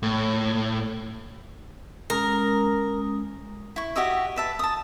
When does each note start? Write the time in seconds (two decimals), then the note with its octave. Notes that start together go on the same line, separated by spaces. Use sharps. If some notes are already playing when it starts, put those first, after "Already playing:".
0.03 A2
2.10 G#3 C#4 A#4 D#6
3.76 E4 C#6
3.96 F#4 G4 D#5 E5
4.36 B4 E5 A5
4.59 A5 D#6